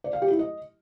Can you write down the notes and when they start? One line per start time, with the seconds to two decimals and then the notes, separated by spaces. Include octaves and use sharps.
0.04 D5
0.13 F5
0.22 G4
0.30 E4
0.39 D#5